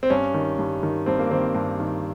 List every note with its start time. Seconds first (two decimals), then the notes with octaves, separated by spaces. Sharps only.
0.03 C4
0.10 G2 C#4
0.34 D#3
0.59 G2
0.83 D#3
1.06 G2 C4
1.19 A#3
1.31 D#3 C4
1.55 G2
1.80 D#3